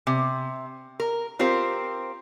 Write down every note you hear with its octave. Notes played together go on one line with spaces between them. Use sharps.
C3
A#4
C4 F4 G4 A#4 C5